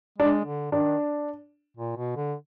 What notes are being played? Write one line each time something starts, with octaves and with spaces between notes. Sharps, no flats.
G#3 D4
D3
D#3 D4
A#2
B2
D3